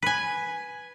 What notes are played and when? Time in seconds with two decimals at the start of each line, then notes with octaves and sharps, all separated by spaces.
0.02 B4 G#5